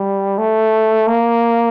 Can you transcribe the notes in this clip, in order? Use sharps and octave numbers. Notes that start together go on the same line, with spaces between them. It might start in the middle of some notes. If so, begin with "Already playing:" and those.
Already playing: G3
A3
A#3